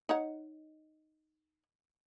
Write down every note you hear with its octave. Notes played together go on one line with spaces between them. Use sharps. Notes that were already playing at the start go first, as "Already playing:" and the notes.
D#4 C#5 F#5